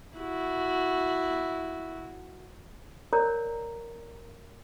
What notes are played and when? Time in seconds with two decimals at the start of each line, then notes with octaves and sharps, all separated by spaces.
0.18 E4 F#4
3.13 A#4 C#5 D5 A#5